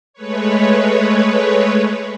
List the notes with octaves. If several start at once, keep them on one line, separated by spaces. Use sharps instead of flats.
G#3 A3 B4 C#5